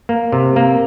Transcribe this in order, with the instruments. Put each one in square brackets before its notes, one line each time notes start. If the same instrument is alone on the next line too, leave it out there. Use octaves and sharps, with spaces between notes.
[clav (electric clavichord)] A#3
C3
A#3